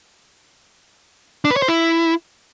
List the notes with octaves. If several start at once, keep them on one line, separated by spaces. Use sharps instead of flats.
D4
B4
C#5
C5
E4